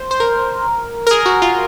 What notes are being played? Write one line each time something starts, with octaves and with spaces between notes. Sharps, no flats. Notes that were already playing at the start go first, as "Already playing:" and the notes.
Already playing: C5
C5
A#4
A#4
G#4
F#4
F4